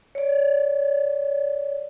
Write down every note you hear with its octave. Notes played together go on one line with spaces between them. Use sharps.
C#5 D5